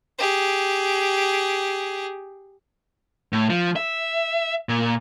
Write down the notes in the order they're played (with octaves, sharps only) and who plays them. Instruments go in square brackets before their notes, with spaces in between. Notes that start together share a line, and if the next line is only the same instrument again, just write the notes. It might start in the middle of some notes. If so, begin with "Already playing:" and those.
[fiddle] G4 G#4
[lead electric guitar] A2
F3
E5
A#2